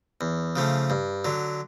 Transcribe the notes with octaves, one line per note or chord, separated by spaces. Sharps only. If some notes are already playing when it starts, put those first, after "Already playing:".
E2
C#3 F3 A3
G2
D3 F#3